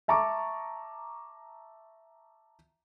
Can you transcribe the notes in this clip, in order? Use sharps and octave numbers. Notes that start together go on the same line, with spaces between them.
E5 A5 A#5 C#6 D6